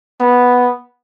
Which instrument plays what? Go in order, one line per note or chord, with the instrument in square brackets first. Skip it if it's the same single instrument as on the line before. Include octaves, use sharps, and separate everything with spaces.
[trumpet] B3